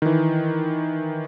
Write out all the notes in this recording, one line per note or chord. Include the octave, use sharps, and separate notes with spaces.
D#3 E3